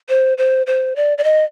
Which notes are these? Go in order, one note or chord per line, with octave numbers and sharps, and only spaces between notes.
C5
C5
C5
D5
D5
D#5